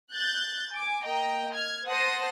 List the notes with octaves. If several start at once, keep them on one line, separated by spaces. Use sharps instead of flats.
F#6 G6 A6
G#5 D6
A#3 D#5 G5 A#5
F6 G#6
C5 F#5 A5 D#6 A#6